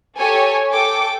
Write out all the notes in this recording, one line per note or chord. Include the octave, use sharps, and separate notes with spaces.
G4 A4 C#5 G#5
A4 G5 D6